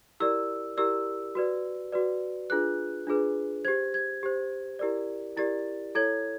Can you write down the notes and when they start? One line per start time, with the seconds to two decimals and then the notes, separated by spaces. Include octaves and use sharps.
0.20 E4 G4 A#4 D5 E6
0.77 E4 G4 A#4 D5 E6
1.35 F#4 B4 D5
1.92 F#4 B4 D5
2.50 D4 F4 G#4 B4 F#6
3.07 D4 F4 G#4 B4
3.65 G4 C5 G#6
3.94 G#6
4.23 G4 C5
4.79 E4 G4 A#4 D5
5.37 E4 G4 A#4 D5 A6
5.95 E4 A4 C#5 G#6